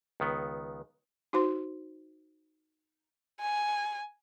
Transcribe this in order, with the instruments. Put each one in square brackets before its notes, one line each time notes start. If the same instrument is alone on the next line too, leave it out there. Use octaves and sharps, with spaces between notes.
[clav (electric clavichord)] C#2 D#3 B3
[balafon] D#4 F#4 C5 C6
[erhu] G#5